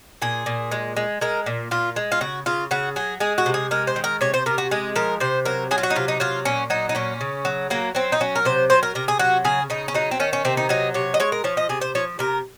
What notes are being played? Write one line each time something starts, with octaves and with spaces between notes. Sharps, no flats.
A#2 G#4
A#2
G#3
G#3
G#3 A#4
A#2
A#2 F4
G#3
F4
C#3 F#4
C#3 F4
C#3 F#4
F#3 G#4
G#3 G#4
F#4
C3
G#4
G#3 A#4
C5
D#3
A#4
C3 C#5
C5
C3 A#4
F#4
G#3 G#4
F3 A#4
C3 C5
F#3 A#4
F#3 G#4
F4
F#4
D#4
C3 F4
D#4
F#3 F4
A#2 C#4
F#3 D#4
D#4
A#2 C#4
C#3
F#3
F#3 A#3
F#3 C4
D#4
F#3 C#4
A#4
C3 C5
F#3 C5
A#4
C3 A#4
G#4
F#3 F#4
C#3 G#4
C#3 D#4
C#4
F#3 D#4
C4
D#3 C#4
C#4
C3 C4
D#4
F#3 D#4
C3 C#5
D#5
G#3 C#5
A#4
F3 C#5
D#5
C3 G#4
C5
F3 C#5
C3 A#4